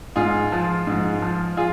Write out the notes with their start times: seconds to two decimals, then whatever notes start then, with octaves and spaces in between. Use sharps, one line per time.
0.16 G#2 F4 G#4
0.52 F3
0.87 G#2
1.22 F3
1.57 F4 G#4